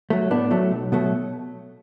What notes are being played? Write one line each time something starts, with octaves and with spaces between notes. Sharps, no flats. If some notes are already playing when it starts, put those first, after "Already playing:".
F#3 A3
A2 B3 D4
F#3 A3
B1
B2 F#3 A3